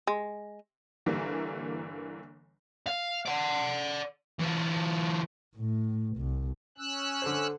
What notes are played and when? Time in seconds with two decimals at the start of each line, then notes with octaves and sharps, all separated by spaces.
0.07 G#3
1.06 G1 D3 E3 G3 A#3
2.87 F5
3.26 D5 F#5
4.39 E3 F4
5.56 A2
6.17 C2
6.78 C#4 E6 F#6
7.22 D3 A4 C5